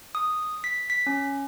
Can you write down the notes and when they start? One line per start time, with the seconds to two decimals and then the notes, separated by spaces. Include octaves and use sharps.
0.15 D#6
0.64 B6
0.90 B6
1.06 C#4